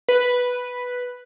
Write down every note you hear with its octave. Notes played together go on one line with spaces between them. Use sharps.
B4